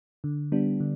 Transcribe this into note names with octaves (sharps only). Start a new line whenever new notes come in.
D3
G3 B3 D4
D3